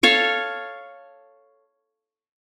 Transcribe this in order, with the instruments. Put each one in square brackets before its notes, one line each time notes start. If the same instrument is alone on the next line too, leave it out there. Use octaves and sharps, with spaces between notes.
[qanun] A4 C#5 F5